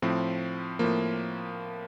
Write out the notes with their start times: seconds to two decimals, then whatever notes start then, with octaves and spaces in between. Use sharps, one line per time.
0.02 A2 F3 C4
0.79 A2 F3 A#3